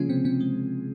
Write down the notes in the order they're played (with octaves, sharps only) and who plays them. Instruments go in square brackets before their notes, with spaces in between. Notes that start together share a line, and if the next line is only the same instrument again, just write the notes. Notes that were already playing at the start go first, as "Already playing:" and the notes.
Already playing: [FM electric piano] C#3 F3 G#3 A#3 C#4 F4 G#4
C3 C4
C3 C4
G#3